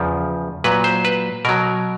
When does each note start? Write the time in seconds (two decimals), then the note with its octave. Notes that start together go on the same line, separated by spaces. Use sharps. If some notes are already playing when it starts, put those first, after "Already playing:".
Already playing: E2 C#3 F3
0.64 A#2 F#3 B4
0.84 C5
1.05 B4
1.45 B2 F#3 A#4